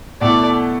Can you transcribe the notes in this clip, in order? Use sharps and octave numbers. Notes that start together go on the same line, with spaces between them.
B2 A3 E4 A4 D5